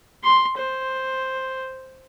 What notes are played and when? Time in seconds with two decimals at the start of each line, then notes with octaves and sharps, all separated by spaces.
0.24 C6
0.58 C5